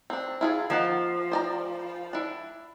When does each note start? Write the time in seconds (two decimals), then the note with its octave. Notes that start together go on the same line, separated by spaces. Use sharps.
0.10 C4 D4
0.41 E4 F4 G#4
0.70 F3 A#3 D#4 F#5
1.31 C5 D5 A#5
2.13 D4 E4